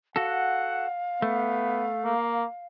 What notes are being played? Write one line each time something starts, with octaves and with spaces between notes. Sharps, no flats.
F#4 A4 F5 F#5
A3 B3
A#3